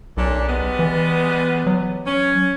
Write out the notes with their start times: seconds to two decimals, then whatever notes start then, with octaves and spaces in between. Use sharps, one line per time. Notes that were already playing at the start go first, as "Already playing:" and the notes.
0.17 B1 A#2 C#4 D4
0.48 G3 G#3 B3
0.79 E3
1.67 F#3
2.06 C#4